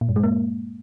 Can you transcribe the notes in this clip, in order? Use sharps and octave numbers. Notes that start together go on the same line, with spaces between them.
A#2
G2
G#3
A#3